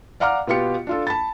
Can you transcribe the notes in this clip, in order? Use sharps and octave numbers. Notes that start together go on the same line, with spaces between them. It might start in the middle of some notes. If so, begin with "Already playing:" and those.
D5 F5 F#5 A#5 D6 F6
B2 B3 F4 G4 C#7
D4 F4 A4
A5 B5 A6